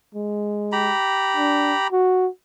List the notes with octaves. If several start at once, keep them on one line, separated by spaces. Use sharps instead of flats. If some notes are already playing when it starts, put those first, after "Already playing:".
G#3
G4 A#5 B5
D4
F#4